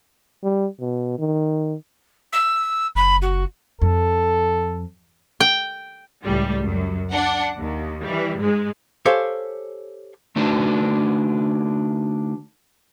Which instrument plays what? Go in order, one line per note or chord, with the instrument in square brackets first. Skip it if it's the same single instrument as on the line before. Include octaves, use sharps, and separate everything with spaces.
[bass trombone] G3
B2
D#3
[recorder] E6
[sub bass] F#1 [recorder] B5
[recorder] F#4
[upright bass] F2 [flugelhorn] A4
[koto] G5
[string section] C#2 A2 G3
F#2
D4 F#5
D#2
E3 G3
G#2 G#3
[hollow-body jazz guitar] G4 A4 C5 C#5 F5 G#5
[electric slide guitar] D3 A3 D4 D#4 F#4 B4